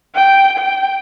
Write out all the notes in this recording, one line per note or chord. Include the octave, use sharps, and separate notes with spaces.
G5
G5